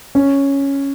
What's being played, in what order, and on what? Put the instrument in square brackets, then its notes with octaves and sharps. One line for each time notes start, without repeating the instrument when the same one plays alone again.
[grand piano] C#4